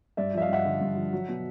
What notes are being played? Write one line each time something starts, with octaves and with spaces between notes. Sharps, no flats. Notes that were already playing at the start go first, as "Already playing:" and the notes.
G2 D5 E5
F3 E5
D#5 F5
G2 E5 F#5
D3
G2
F3
F#3
B2